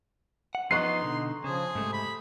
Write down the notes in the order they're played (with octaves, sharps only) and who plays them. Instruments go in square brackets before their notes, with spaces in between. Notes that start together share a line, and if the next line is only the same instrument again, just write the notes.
[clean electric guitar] F#5
[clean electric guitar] F3 B3 D#5 [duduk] D#4 [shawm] C6 [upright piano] C#6 F#6 C7
[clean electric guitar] B2 D3
[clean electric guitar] C#3 [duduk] F3 [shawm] G#4
[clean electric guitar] G#2 A3 [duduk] C3
[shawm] B5